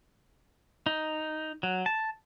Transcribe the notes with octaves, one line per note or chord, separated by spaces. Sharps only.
D#4
F#3
A5